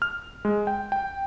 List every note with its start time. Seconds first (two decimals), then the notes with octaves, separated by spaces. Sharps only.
0.02 F6
0.45 G#3
0.67 G5
0.92 G5